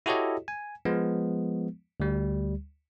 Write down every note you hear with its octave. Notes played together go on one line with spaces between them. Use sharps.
E4 F#4 G4 A4 C#5 D#5
G#5
F3 G#3 B3
D2 G3